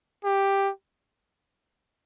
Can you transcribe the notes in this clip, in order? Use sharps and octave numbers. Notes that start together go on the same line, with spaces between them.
G4